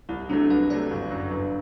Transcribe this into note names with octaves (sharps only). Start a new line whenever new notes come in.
C2 E4
C3 F#3 A3 D4
C2 B4
C3 F#3 A3 D5
G1
F#2 F#3
G1